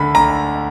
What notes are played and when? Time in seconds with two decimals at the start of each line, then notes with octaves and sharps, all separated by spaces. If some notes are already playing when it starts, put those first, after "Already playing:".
Already playing: D2 D3 B5
0.15 D2 A#5